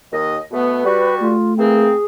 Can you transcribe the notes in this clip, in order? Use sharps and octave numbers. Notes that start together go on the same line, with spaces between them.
D#2 D#5
B2 A3 B3 B4
G3 F#4
A3 F4
E3 A#3 C4 G#4